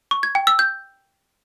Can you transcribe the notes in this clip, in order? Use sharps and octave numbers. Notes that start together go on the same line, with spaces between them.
C#6
G#6
G5
E6
G6